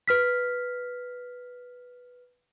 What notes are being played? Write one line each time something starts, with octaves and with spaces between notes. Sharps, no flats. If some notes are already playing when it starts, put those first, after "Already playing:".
B4 F6 B6